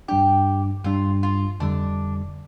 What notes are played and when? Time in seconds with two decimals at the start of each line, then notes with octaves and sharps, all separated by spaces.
0.08 G2 G3 D4 G4
0.84 G2 G3 D4 F4
1.23 F4
1.60 F2 D3 G3 D4